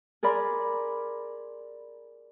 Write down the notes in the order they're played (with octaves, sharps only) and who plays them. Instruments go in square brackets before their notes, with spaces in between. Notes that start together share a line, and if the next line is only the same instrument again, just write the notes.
[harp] G#4 A#4 D5 B5 C6